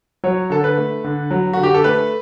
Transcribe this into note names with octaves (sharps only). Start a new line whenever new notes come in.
F#3 C#5
D3 A4
B4
A3
D3
F#3
D3 F#4
G4
A4
A3 B4